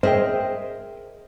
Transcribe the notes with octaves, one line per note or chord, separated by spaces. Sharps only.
G#4 A#4 C5 D#5 E5 G5